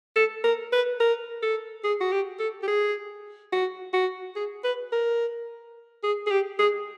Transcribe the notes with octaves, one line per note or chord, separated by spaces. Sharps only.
A4
A#4
B4
A#4
A4
G#4
F#4
G4
A4
G4
G#4
F#4
F#4
G#4
B4
A#4
G#4
G#4
G4
G#4